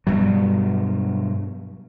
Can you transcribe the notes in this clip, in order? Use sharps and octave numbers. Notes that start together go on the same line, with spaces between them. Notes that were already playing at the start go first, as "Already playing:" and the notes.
G2 B2 F#3